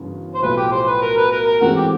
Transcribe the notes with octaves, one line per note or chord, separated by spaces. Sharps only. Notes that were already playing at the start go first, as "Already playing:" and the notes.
Already playing: G1 F#2 C#3 E3
C5
B1 A2 F3 A3 B4
G4
C5
B4
A#4
B4
A#4
A#4
G#2 E3 A3 C4 F#4
G4